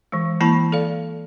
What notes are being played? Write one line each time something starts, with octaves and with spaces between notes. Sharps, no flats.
E3 G#3
E3 A#3 E4 A5 B5
A4 D5 F5